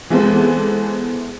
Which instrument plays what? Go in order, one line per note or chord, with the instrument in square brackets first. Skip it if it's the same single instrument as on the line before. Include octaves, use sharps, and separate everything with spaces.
[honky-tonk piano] E3 G#3 B3 A4 C5